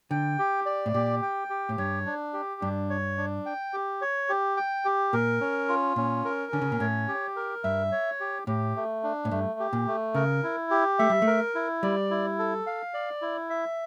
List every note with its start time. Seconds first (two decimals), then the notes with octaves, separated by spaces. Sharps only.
0.11 D3 G5
0.39 G4
0.66 D5
0.86 A2
0.94 A#2 G4
1.22 G5
1.50 G4
1.69 A2
1.78 G2 C#5
2.06 D4
2.33 G4
2.61 G2 D4
2.90 C#5
3.18 D4
3.46 G5
3.73 G4
4.01 C#5
4.29 G4
4.57 G5
4.85 G4
5.13 A#2 A#4
5.41 C#4
5.69 F4
5.96 A#2 C#4
6.25 A#4
6.52 D3 C#4
6.62 C#3
6.72 A#2
6.80 A2 C#5
7.08 G4
7.36 A#4
7.64 G2 E5
7.92 C#5
8.20 G4
8.47 A2 G4
8.76 A3
9.03 D4
9.25 A2
9.31 G2 A3
9.60 G4
9.73 A#2
9.87 A3
10.15 C#3 A#4
10.43 E4
10.71 G4
10.99 A3 E5
11.10 G3
11.22 A3
11.27 A#4
11.55 E4
11.83 G3 D5
12.11 E4
12.39 A4
12.67 F5
12.94 D5
13.22 E4
13.50 E5